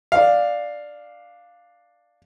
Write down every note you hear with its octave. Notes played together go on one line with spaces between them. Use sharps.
D4 F5